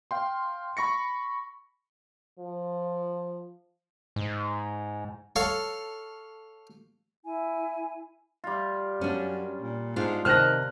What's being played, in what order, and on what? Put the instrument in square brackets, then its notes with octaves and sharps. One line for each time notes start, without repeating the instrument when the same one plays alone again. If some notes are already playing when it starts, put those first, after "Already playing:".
[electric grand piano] F5 G5 C6
B5 C#6 A#6 C#7
[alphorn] F3
[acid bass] G#2
[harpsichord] A4 C#5 F5
[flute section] E4 G#5
[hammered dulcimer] G3 F4
[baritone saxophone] F#2 [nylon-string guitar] C#4 D4
[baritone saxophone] A#2
[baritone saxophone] G#2 [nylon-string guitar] D4 F4
[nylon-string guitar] C3 A5 [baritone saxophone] D#3 [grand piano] F6 F#6 A#6